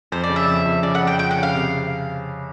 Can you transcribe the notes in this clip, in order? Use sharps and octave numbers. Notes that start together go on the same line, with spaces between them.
F2 C5
D5
C#3
E5
F2
F2
C#3 D5
F#5
F2
G5
F2 G5
F#5
C#3
F5
C3